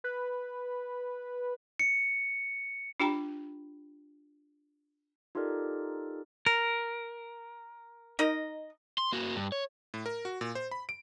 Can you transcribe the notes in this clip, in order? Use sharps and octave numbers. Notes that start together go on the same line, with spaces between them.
B4
C#7
D4 F4 G4 G5 A#5 B5
D#4 F4 G4 A4 A#4 D5
A#4
D#4 A#4 D#5
C6
A#3 F#4
G2
C#5
A2
A#4
F#4
A#2
C5
B5
D7